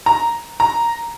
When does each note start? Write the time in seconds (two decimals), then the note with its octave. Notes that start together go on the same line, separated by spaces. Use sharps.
0.06 A#5
0.60 A#5